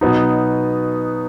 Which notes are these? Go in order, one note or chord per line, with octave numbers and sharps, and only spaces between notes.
B2 F#3 B3 D#4